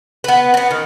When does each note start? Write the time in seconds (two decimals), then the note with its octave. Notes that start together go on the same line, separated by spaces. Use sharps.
0.24 B3 B4
0.54 B3 C4
0.71 D#3